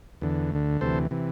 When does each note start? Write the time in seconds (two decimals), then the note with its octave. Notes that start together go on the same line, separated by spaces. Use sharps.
0.21 E2 D3
0.52 D2 D3
0.81 D2 C3 E3 A4 C5
1.11 C3 E3